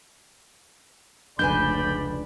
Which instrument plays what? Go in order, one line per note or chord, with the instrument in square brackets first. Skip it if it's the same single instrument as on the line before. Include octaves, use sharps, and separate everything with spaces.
[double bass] F1 C#2 [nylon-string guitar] D4 B4 G#5 [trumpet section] D5 B5 [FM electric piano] G6